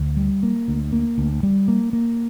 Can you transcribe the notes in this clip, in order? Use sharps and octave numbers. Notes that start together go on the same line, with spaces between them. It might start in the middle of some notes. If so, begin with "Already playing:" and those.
Already playing: D2
G3
A#3
D2
A#3
D2
G3
A#3
A#3